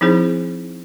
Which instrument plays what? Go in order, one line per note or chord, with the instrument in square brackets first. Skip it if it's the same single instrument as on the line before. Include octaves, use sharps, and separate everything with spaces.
[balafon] F3 C4 D#4 E4 G#4 C5